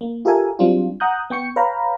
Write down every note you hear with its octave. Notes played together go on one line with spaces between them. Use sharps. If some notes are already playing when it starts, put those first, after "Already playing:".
A#3
F4 G4 A4 A#4 E5 G#5
F#3 G3 C4 D4 F4
F#5 A#5 D#6 F#6 G6
B3 G5 C#6 C#7
B4 C#5 F5 G5 A#5 B5